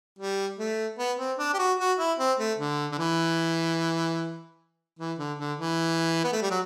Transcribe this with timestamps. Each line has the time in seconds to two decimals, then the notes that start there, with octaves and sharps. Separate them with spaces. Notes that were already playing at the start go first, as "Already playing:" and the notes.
0.18 G3
0.59 A3
0.99 B3
1.19 C4
1.38 D4
1.54 G4
1.59 F#4
1.78 F#4
1.99 E4
2.19 C4
2.39 A3
2.58 D3
2.92 D3
2.98 E3
4.99 E3
5.19 D3
5.39 D3
5.59 E3
6.24 B3
6.32 A3
6.41 G3
6.50 F#3